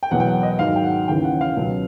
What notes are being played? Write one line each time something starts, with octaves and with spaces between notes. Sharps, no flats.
G5
E2 B2 F#3 F#5
G5
F#5
D#5
G#2 D#3 F#3 F5
G5
F#5
D#2 C#3 E3 G5
F#5
F5
C#2 B2 F#3